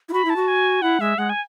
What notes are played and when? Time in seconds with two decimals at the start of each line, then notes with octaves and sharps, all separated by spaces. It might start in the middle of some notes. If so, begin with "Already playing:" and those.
0.09 E4
0.13 F#4 B5
0.25 E4 A5
0.36 F#4
0.48 G#5
0.82 E4 F#5
1.00 G#3 E5
1.18 G#3 F#5
1.30 G#5